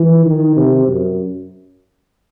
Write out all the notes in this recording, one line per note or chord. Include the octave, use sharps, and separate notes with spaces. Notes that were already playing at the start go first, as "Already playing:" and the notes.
Already playing: E3
D#3
C3
F#2